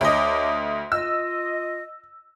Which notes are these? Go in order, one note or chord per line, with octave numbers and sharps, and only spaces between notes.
D2 C#5 D#5 A5 D6
F4 D#5 E6